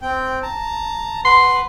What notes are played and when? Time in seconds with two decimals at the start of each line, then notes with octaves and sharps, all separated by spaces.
0.02 C4 G5
0.42 A5 A#5
1.25 B4 F#5 C6